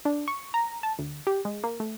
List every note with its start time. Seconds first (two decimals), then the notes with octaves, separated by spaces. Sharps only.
0.05 D4
0.28 C#6
0.54 A#5
0.83 A5
0.99 D2
1.27 G4
1.45 G#3
1.64 A#3
1.80 A3